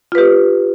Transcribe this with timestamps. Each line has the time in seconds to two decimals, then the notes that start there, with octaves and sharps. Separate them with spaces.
0.12 F4
0.15 B4
0.18 G4